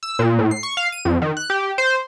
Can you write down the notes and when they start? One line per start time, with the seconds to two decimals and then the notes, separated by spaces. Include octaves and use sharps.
0.03 E6
0.19 A#2
0.39 A2
0.51 C7
0.63 C#6
0.77 F5
0.92 D#7
1.05 F2
1.22 D#3
1.37 F#6
1.50 G4
1.78 C5